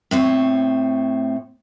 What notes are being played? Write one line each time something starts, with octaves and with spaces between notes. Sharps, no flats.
A2 C4 C#5